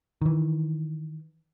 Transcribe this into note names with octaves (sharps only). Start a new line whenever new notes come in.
D#3 E3